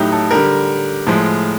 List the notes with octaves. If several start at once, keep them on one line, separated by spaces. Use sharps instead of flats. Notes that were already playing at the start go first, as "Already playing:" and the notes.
Already playing: A2 F#3 D#4 E4 G4
A4
D3 G3 A#4
A2 F3 G#3